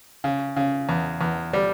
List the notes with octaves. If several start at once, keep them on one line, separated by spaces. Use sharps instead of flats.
C#3
C#3
E2
E2
G3